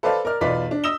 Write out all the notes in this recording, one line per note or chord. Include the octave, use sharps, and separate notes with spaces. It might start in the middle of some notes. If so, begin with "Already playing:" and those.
A4 B4 C5 D5 F5 A5
A#4 D5 F6
B1 E2 F4 B4 D5 B6
D4
D#6 E6 A#6 E7 G7